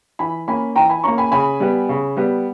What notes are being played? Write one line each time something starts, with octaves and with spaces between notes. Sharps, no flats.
E3 G#5 B5
A#3 C#4 G#5 B5
E3 G5 A#5
G#5 B5
A#3 C#4 A#5 C#6
G#5 B5
C#3 G#5 B5
G3 B3
C#3
G3 B3